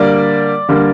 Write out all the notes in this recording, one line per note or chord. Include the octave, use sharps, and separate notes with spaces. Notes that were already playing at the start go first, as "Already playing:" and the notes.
Already playing: D3 G3 A#3 D5
D3 G3 A#3